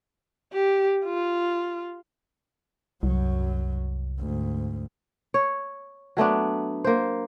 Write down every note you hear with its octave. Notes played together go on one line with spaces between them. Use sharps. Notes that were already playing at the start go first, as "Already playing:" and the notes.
G4
F4
C2 F#2 F#3
D2 G#2
C#5
F#3 A3 B3 D4
A#3 C5